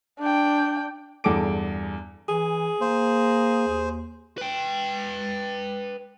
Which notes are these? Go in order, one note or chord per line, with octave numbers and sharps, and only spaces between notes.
D4 G5
E2 G2 G#4 A4 D6 D7
E3 G#4
A#3 C5
D#2
B4 G5